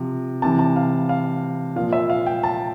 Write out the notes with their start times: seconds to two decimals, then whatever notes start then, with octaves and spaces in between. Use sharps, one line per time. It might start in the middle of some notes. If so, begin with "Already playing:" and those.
Already playing: C3 F3
0.42 C3 E3 A5
0.59 A5
0.76 F5
1.09 F5
1.76 A#2 F3 F5
1.93 E5
2.10 F5
2.26 G5
2.43 A5